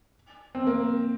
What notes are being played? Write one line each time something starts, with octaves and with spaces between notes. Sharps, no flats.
C4
A#3